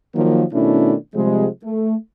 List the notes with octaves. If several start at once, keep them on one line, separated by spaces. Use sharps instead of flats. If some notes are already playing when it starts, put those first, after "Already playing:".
D#3 F3 F#3 A#3
B2 D#3 A3 C#4 D4 E4
C3 F3 G3 G#3
A3